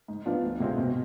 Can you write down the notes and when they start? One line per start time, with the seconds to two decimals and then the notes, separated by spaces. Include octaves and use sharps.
0.08 G#2
0.26 F3 B3 D4 F4
0.43 D2
0.60 C3 G#3 C4 F4
0.78 B2